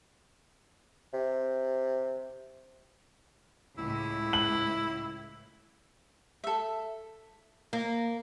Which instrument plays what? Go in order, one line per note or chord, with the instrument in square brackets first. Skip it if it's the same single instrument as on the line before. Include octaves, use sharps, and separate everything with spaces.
[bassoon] C3
[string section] C#2 A2 [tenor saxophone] E4
[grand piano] F#7
[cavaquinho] A4 E5
[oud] A#3